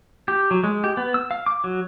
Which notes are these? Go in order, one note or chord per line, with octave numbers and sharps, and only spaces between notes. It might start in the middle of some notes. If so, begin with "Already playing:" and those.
G4
F#3
G#3
G4
B3
E6
F5
D6
F#3